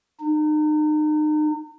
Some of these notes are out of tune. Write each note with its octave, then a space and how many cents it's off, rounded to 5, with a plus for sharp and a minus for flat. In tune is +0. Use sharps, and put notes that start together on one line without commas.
D#4 -35